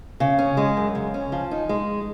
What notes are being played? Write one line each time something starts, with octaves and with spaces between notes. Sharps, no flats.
C#3
C#4
G#3
F#2
C#3
C#4
F3
D#4
G#3